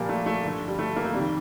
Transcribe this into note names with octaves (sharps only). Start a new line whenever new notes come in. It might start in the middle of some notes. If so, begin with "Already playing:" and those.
Already playing: A#2 F3 G3 A#3
A3
A3
G2 D3 F3
G3
A3
A#3
A3
F2 C3 D#3 G3